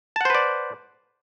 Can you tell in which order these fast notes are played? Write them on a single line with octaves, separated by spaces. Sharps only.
A5 F#5 C5 B4 D5